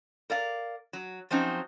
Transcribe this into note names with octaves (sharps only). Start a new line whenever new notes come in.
A#4 D5 F5
F#3
F3 F#3 C4 C#4 D#4